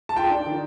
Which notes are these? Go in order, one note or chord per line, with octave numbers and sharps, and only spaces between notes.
A5
F4 G5
D4
D#3